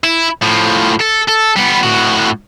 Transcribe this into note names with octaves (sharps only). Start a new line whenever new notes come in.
E4
A2 F3
A4
A4
G3 B3
A2 F#4